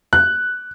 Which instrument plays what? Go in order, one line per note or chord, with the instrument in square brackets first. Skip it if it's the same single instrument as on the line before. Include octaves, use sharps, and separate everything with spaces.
[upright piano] F#6